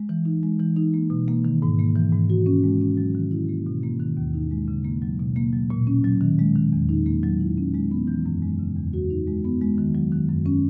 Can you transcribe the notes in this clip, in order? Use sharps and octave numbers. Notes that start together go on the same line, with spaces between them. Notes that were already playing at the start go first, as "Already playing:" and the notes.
Already playing: G#3
E3
D#4
G#3
E3
D#4
A#3
B2
A#3
D#3
G#2
A#3
E3
G#2
F#4
C#4
G#3
C#4
F#3
D#3
E4
A#3
B2
A#3
D#3
D#2
D#4
G#3
C#3
A#3
F#3
B2
A#3
F#3
A#2
C#4
F#3
D#3
G#3
D#3
E2
D#4
A#3
F#3
E4
C#4
G#3
B3
E3
F#2
G#3
C#3
E2
F#4
D#4
G#3
B3
G#3
D#3
F#3
D#3
F#2
C#4